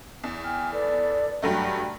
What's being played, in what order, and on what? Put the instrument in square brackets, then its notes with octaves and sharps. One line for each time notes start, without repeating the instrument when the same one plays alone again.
[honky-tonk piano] E2
[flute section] G5 G#5 F6
A4 B4 D5
[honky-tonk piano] G2 F#3 A3 [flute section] G4